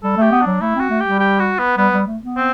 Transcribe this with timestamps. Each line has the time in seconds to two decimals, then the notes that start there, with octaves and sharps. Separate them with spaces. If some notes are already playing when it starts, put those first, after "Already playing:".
0.03 G3 A4
0.17 A3 G4
0.32 B3
0.41 F#3 D4
0.61 A3 E4
0.76 C4 F#4
0.90 A3
1.00 G3 G4
1.19 G4
1.39 F#4
1.59 B3
1.77 G3 B3
1.93 G3
2.07 A3
2.22 B3
2.37 C4